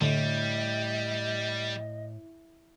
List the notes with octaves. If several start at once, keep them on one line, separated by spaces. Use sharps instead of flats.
A2 D3 G3 D#5